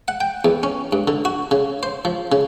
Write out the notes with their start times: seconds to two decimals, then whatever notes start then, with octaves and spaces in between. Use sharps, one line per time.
0.08 F#5
0.20 G5
0.45 E2
0.63 C#4
0.93 G2
1.08 D3
1.25 F#4
1.51 C#3
1.83 C5
2.05 F3
2.32 C#3